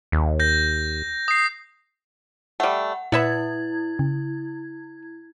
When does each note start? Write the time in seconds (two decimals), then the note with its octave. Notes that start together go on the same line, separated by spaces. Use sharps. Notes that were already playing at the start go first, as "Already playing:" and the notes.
0.12 D#2
0.40 G6 A#6
1.28 D#6 C7
2.60 G3 A3 F#5
3.12 A#2 E4 B4 E5 F#5 G#6
3.99 C#3